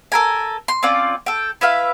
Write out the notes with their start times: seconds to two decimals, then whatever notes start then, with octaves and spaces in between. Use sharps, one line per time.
0.12 A4 A#4 G#5
0.68 C6
0.83 C4 C#4 F4 D5
1.26 A4 G5
1.61 E4 B4 E5 F5